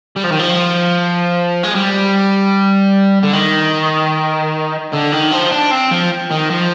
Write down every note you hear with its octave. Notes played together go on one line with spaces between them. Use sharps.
G3
F3
D#3
F3
G#3
G3
D3
D#3
D3
D#3
F3
D4
C4
F3
D#3
F3